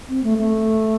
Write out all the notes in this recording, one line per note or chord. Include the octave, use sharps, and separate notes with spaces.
C4
A3
A3